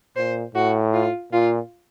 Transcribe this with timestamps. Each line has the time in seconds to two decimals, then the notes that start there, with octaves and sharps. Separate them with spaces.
0.16 A#2 C5
0.55 A2 F#4
0.94 F4
1.32 A#2 F4